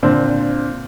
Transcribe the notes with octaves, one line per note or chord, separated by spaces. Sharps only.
A#2 D3 C4